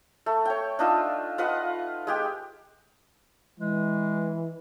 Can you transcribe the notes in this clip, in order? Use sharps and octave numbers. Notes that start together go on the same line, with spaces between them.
A3
C#5 G5
D4 D#4 F4 E5
F4 B4 D#5 F#5
G#3 G4 G5
E3 G#3